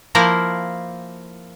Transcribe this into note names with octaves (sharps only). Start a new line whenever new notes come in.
F3 A#3 E4 A#4 C5